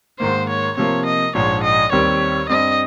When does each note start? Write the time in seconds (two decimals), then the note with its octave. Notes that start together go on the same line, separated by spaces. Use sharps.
0.20 G#2 D#3 A#3 C5
0.49 C#5
0.77 C3 F3 A#3 C#5
1.05 D#5
1.35 A#1 G#2 F3 C#5
1.63 D#5
1.92 D#2 D#3 G3 C4 C#5
2.49 G2 G3 C4 D#5